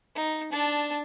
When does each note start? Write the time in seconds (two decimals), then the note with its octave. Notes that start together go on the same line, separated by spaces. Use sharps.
0.15 D#4
0.51 D4 A5